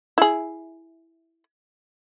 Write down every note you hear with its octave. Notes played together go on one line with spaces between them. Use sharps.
E4 G#4